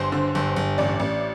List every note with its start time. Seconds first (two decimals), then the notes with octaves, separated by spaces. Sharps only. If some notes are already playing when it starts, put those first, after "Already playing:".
Already playing: G1 C5
0.12 D3
0.35 G1
0.56 G1
0.78 A1 D5
1.00 A1